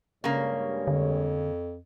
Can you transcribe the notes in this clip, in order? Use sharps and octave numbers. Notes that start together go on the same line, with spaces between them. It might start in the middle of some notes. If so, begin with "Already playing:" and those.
G2 C#3 G#3 A#3 C#5
F2 D3